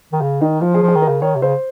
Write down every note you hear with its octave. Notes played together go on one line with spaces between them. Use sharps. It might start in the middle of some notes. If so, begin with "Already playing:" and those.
D#3
C#3
D#3 D#4
F3 F4
G#4
F3
G#4
D#3
A#4
C#3
D#3 C#5
C3
C#3 C5